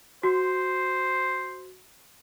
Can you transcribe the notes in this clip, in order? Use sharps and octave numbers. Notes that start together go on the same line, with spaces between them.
F#4 C5